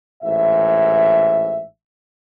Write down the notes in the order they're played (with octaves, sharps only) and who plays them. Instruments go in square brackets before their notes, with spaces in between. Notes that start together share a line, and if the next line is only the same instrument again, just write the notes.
[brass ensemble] A1 G#2 E5